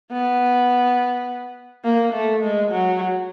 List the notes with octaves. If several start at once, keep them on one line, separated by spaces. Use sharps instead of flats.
B3
A#3
A3
G#3
F#3